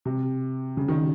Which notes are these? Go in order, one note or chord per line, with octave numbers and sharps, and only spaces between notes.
C3
C#3
D#3